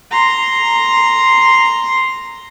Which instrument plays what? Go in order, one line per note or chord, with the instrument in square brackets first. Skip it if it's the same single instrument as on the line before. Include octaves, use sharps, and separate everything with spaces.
[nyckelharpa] A#5 C6